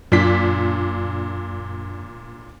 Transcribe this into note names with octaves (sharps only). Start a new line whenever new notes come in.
F#2 A#2 D4 B6